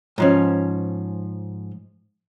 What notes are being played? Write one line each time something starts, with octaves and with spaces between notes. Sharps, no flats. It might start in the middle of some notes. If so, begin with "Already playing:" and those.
G#2 F3 C#4